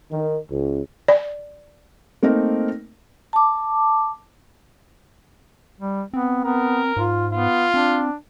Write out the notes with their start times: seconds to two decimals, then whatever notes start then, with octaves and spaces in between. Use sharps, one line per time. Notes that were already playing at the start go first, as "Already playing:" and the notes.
0.12 D#3
0.50 C#2
1.08 D5
2.23 A3 A#3 C4 D#4 A#4
3.33 A5 D6
5.81 G3
6.13 B3 C4
6.45 B3 A#4
6.97 G#2 F4
7.33 B3 F4
7.74 C4 D4